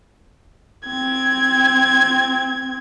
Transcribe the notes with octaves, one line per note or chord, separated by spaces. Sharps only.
C4 G#6